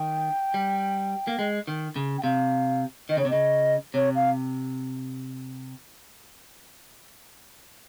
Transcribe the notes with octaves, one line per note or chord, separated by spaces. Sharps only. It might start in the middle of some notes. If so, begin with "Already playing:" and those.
Already playing: D#3 G5
G3
A#3
G#3
D#3
C#3
G5
C3 F5
D#3 D#5
C#3 C#5
C3
C#3 D#5
C3 C#5
F5